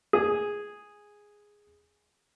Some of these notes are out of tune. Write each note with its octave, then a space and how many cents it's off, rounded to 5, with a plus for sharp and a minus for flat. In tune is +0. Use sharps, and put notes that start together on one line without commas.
G#4 -5